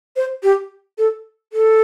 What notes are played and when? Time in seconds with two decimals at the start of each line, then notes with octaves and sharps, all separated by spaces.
0.16 C5
0.43 G4
0.98 A4
1.53 A4